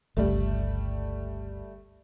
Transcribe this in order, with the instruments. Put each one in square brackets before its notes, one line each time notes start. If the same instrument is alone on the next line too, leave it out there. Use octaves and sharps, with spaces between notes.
[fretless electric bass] G1 C#2 [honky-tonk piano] G3 A3